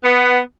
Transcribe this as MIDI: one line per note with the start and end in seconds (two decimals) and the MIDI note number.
0.04 0.38 59